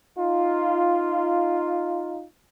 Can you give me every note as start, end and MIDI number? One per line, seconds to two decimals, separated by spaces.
0.19 2.25 63
0.19 2.25 65